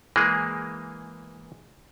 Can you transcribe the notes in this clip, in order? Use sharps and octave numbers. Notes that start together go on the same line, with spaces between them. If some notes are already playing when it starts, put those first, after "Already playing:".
E3 G#3 A#3 G#4